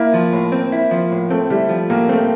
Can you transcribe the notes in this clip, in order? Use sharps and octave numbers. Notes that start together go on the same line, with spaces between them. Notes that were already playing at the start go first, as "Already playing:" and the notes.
Already playing: A#3 E4
F3
A2
C4
E4
F3
A2
A3 C4
G3 E4
F3
A2 A#3
A3 C4